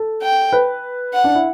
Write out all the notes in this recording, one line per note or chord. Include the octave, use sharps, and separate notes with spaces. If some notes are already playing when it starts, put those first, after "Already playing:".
Already playing: A4
G5
B4
F#5
D4
E4